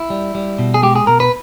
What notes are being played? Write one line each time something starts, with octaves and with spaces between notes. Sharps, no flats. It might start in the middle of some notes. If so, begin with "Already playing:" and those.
Already playing: E4
G3
G3
B2
G#4
G#3 G4
G#4
B2 A#4
B4